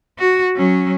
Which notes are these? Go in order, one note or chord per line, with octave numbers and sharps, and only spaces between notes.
F#4
F#3 C#4